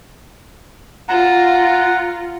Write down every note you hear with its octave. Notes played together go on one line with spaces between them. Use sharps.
F4 F#5 A#5